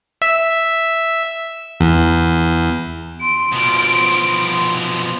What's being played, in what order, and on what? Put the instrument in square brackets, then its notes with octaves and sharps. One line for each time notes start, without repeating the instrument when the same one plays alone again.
[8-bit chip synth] E5
E2
[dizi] C6 [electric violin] D7
[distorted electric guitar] B2 F3